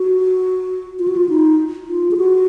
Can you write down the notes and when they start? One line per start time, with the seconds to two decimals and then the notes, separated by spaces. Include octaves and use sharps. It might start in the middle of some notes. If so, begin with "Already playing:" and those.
Already playing: F#4
0.99 F4
1.08 F#4
1.17 F4
1.29 D#4
1.87 F4
2.11 G#4
2.17 F#4